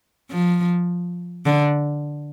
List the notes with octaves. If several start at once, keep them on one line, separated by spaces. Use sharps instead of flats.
F3
D3